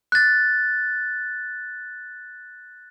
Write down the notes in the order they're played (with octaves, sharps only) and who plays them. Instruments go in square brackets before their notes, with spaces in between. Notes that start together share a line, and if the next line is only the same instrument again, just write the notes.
[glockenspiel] F#6 A6